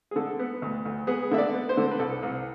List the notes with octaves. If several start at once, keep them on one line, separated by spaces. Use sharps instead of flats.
G#4
D3 A4
B3
D2
D2
B3 G#4
D3 E5
D5
B3
C5
D3
B4
C2 A4
C2